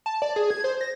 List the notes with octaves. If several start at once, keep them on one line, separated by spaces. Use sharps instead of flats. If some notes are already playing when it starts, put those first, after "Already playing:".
A5
D5
G#4
G#6
C5
A#6